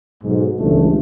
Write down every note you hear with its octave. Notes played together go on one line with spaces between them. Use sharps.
B1 G#2
G1 C#2 E3 A3